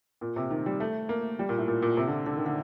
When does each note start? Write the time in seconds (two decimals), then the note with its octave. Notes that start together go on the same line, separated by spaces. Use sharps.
0.21 A#2
0.36 C3
0.50 D#3
0.66 G3
0.80 A3
1.09 A#3
1.39 G3
1.49 A#2
1.58 A2
1.68 A#2
1.82 A#2
1.97 C3
2.07 D3
2.26 D3
2.37 D#3
2.46 D3